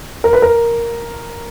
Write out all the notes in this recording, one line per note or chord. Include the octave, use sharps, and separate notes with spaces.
A#4
B4
A#4